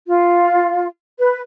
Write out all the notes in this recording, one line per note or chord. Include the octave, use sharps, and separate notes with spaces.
F4
B4